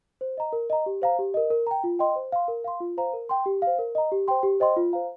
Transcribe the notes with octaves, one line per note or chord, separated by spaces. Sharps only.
C5
D#5 A#5
A#4
D#5 A#5
G4
C5 F5 A#5
G4
A#4 D#5
A#4
G5 A#5
F4
D#5 G5 C6
C5
F5 C6
A#4
F5 C6
F4
C5 F5 A#5
A#4
G5 C6
G4
C5 F5
A#4
D#5 A#5
G4
C5 G5 C6
G4
C5 D#5 G5 C6
F4
C5 F5 A#5